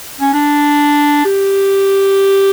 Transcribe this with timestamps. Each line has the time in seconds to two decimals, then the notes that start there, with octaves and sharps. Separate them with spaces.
0.21 C#4
0.33 D4
1.25 G4